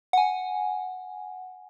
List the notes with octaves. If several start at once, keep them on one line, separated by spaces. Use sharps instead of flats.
F#5 G#5